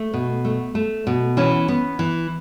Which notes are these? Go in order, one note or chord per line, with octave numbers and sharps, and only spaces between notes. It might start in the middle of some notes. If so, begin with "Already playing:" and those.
Already playing: A3
B2
A3
A3
B2
E3 C#4
B3
E3